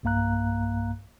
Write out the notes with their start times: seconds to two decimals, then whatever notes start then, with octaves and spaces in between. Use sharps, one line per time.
0.03 B1 G2 A#3 F5 A#5 F#6